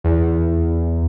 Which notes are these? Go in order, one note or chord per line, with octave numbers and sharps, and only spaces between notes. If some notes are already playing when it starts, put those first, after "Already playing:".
E2